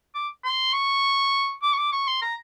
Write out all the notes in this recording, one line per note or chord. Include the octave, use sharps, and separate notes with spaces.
D6
C6
C#6
D6
C#6
D6
C#6
C6
A#5